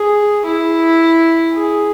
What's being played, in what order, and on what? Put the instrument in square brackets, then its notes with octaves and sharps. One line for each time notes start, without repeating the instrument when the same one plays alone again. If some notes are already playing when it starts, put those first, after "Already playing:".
Already playing: [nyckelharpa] G#4
E4
G#4